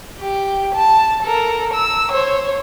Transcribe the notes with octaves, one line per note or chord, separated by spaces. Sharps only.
G4
A5
A4 A#4
E6
C5 C#5